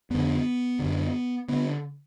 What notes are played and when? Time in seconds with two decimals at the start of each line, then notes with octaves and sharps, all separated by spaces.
0.10 F2 D3 B3
0.79 F#2 D3
1.49 D3 B3